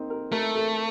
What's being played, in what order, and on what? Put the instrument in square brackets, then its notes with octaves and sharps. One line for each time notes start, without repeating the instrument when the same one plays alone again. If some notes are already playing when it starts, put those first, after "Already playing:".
Already playing: [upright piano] A#3 C4 D#4
A#4
[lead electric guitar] A3 [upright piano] A#4
[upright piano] A4